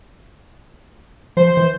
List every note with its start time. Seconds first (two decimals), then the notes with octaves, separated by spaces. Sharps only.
1.37 F3 C5
1.57 E3